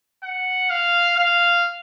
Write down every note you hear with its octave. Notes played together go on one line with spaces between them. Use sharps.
F#5
F5
F5